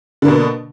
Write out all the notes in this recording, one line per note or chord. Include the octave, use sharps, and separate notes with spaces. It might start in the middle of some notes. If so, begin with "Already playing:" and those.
B2 D3 A#3